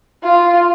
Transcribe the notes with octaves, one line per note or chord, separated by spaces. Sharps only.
F4